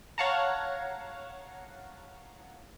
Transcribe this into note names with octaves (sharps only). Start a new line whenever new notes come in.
C#5 F5 F#5 A5 A#5